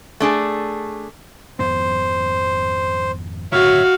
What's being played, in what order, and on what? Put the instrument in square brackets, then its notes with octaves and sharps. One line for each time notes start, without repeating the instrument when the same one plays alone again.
[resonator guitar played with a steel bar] A3 D4 G#4
[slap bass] G#1 F2 B3 [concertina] C5
[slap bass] D1 G2 C#3 [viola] F#4 F5 [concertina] C#5 E5